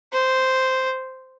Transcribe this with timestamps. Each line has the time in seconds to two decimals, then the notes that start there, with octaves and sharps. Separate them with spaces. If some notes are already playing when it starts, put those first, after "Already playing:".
0.13 C5